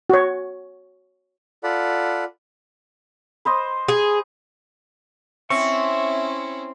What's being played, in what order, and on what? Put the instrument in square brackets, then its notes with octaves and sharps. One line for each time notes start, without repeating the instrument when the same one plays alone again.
[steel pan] F#4 C#5
[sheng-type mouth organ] F4 A4 D5 F#5 B5
[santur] B4 C5 D#5
[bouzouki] G#4
[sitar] C4 [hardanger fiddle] C#4 E4 [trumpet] E5 [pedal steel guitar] C#6